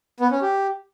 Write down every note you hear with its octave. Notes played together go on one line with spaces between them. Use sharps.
B3
C#4
G4